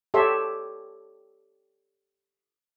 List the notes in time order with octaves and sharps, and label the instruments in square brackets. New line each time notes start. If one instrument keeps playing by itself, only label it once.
[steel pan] G4 A4 C#5 E5 C6